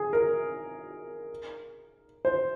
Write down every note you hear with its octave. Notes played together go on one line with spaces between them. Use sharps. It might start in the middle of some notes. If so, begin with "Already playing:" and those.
Already playing: G#4
A#4
C5